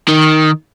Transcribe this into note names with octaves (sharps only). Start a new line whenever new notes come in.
D#3